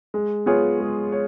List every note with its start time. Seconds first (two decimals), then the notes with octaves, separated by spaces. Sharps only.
0.14 G#3
0.46 B3 F4 G#4 C#5
0.80 G#3
1.12 C#5